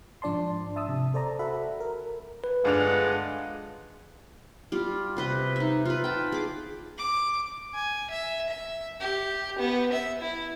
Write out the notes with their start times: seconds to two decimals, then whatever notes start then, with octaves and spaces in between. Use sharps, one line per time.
0.22 G#2 F3 D4 D5 A5 C6
0.76 E5 A5 D#6 E6
0.88 C3
1.14 A4 C5 D5 A5 A#5
1.39 F#4 A4 E5 F#5 B5
1.80 A#4
2.44 B4
2.65 G1 G#3 D4 F4 A4 F#5 F7
4.72 G3 F4
5.17 C3 B4 D#5
5.56 D#4 E5
5.85 F4 B4
6.04 G5 A5
6.32 G#4 D6
6.98 D6
7.74 G#5
8.10 E5
8.49 E5
9.00 G4
9.59 B3
9.92 E5
10.21 E4